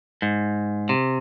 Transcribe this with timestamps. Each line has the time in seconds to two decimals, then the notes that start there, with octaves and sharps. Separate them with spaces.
0.22 G#2
0.89 C3